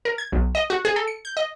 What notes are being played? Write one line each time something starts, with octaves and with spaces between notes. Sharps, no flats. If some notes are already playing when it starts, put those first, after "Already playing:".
A#4
G#6
B1
D#5
F#4
G#4
A4
C#7
G6
D#5